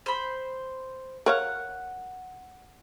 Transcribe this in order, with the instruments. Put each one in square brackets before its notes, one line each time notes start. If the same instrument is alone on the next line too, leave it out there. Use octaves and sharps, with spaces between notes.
[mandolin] C5 B5
[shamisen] A#4 C#5 F5 [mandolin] F#5